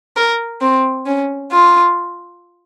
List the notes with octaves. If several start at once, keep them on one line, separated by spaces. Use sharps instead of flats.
A#4
C4
C#4
F4